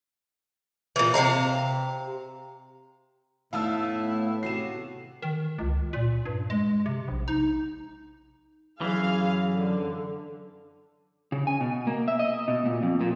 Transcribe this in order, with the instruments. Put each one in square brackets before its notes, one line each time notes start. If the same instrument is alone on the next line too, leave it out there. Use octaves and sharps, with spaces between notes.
[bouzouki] A#2 E3
C3 A#3 F5 A#5
[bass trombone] A2 [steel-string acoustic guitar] A3 B3 [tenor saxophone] E4 [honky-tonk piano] F5 A5 E6
[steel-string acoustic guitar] C3 B3 F#4 [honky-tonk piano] C7 E7
[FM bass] D#3
C#2
A#2
G2
G#3
C3
A#1
D#4
[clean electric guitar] F#2 E3 [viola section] G#4 F5
[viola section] D3
[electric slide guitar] C#3
G#5
B2
A#3
E5
D#5
B2
A#2
F2
A#2